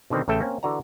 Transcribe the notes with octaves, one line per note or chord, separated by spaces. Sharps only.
B2 D3 D#3 C4
A1 C#3 A3 A4 E5 G5
A#3 C4 C#4
D3 E3 F#4 D5 A#5